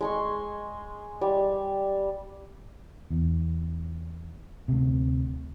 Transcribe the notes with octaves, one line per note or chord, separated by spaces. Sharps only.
G#3 C6 C#6
G3
E2
D2 C3